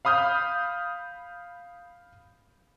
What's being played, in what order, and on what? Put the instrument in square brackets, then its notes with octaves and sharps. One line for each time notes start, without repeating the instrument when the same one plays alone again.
[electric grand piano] F5 B5 D#6 F6 G6